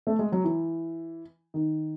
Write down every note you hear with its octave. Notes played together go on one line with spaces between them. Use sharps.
A3
G#3
F#3
E3
D#3